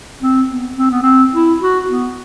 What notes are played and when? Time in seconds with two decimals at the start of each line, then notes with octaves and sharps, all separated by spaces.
0.22 C4
0.49 B3
0.78 C4
0.91 B3
1.03 C4
1.34 E4
1.61 F#4
1.89 B3